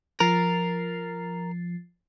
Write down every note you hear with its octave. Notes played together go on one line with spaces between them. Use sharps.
F3 A#4 A6 C7